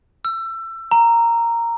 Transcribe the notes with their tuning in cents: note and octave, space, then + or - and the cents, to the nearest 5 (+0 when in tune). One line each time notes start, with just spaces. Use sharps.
E6 +25
A#5 -5